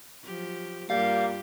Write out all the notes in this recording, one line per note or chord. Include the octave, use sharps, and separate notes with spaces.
F3 F#3 G4
G2 G3 A#3 F4 G4 F5